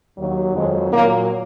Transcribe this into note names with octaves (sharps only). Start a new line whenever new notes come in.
D#2 D#3 F#3
F2 D#3 F#3 G#3
A#2 F#3 A#3